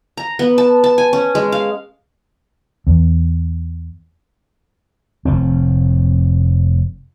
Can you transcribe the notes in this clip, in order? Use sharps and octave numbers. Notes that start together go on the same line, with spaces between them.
A#5
B3
A5
A5
G#5
C#4
G#3
F5
E2
F1 A2 C4